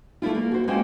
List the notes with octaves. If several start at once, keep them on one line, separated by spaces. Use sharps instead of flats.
A3 A#3 E4 F4
A#3
F#4 C5
G#3 A#3 C#4 F4 C5 G5